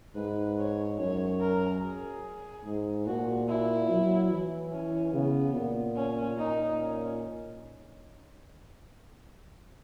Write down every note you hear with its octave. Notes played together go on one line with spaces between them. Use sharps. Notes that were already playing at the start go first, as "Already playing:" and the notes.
G#2 B4
C#5
F#2 C#5
A#4
G#4
G#2
A#2 F#4
E4
F#3
E3
C#4
C#3 B3
A#2
C#4
A#2 D#4
C#4